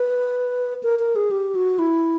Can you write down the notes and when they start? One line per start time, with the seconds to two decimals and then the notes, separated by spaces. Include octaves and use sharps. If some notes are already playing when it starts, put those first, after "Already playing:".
Already playing: B4
0.83 A#4
0.99 A#4
1.16 G#4
1.31 G4
1.55 F#4
1.79 E4